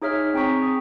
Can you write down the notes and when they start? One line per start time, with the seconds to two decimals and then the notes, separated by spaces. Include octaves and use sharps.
0.02 D#4 G#4 C#5 E5 F6
0.34 C4 G#4 G5 A#5 C#6 B6
0.62 C#6 D#6